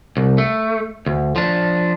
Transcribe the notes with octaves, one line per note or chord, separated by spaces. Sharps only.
C2
A3
D2
F3 D4